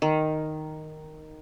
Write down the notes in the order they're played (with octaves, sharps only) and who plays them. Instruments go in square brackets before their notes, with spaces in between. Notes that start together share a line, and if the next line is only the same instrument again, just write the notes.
[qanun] D#3